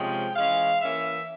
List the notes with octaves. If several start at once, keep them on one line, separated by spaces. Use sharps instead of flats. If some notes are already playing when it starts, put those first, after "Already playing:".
Already playing: C3 F3 G#3 C#4 G5
E3 G#3 C#4 F5
E3 A#3 C#4 E5